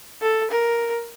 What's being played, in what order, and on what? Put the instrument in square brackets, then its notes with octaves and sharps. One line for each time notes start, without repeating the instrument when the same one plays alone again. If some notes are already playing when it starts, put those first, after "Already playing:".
[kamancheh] A4
A#4